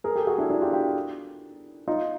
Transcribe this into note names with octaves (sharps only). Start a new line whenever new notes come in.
G#4 A#4
G4 A4
F#4 G#4
D4 E4
D4 E4
F4 G4
F4 G4
D#4 F4